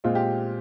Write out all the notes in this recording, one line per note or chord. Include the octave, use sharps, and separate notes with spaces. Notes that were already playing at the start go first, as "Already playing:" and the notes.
A#2 G#3 C4 F4
G4